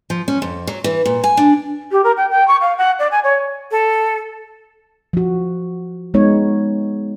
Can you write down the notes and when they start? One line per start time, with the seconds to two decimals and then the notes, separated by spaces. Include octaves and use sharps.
0.10 F3
0.28 C#4
0.42 F2
0.67 F#3
0.84 E3
1.05 A#2
1.24 G#5
1.37 D4
1.92 G4
2.04 A#4
2.17 G5
2.30 G5
2.48 C#6
2.61 F5
2.78 F#5
2.99 D5
3.11 G#5
3.24 C#5
3.71 A4
5.13 F3 F#4
6.14 G#3 B3 D#4 C#5